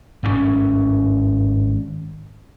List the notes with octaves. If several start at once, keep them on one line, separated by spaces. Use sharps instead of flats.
G#1 G2 C#3 C#4